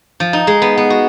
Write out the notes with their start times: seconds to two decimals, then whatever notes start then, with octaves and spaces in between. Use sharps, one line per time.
0.20 F3
0.33 D#4
0.47 G#3
0.62 B3
0.77 B3
0.90 F#4